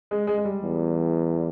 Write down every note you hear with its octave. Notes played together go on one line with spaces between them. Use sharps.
G#3
G#3
G#3
G3
E2